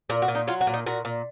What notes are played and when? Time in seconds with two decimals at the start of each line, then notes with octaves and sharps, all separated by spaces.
0.10 A#2 A#4
0.22 F#4
0.28 A#2
0.35 D#4
0.47 F#3 F4
0.61 F#4
0.67 A#2
0.74 D#4
0.86 A#2 F#4
1.05 A#2